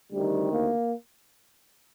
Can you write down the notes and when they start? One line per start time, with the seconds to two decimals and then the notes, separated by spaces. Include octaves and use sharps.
0.12 D2 C3 D#3 G3
0.52 A#3